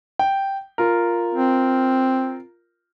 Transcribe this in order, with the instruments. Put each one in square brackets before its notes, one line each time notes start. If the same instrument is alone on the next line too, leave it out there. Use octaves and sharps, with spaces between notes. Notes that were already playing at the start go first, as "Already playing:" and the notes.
[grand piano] G5
F4 A#4
[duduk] C4